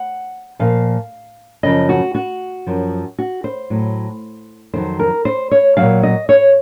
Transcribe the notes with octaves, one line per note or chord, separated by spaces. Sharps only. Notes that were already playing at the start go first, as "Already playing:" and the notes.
Already playing: F#5
A#2 F3 F5
F#2 C#3 F3 D#5
F#4
F#4
F#2 F3
F#4
C5
A2 F#3
F2 D#3 F#3 C5
A#4
C5
C#5
A#2 F#3 F5
D#5
C#5